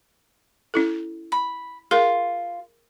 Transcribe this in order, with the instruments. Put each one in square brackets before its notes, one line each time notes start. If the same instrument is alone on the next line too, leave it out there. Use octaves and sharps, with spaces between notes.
[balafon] C#4 E4 A4
[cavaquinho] B5
[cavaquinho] F4 [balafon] G#4 A#4